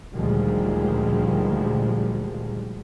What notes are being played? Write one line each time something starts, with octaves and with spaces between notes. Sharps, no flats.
D2 A#2 D#3 F3 G3 G#3